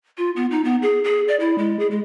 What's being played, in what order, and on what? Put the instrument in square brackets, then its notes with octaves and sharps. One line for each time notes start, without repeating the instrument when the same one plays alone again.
[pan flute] F4
B3
D#4
B3
G#4
G#4
D5
E4
G#3
G#4
G#3